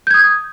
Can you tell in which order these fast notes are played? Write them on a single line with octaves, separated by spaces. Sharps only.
G6 G#6 D#6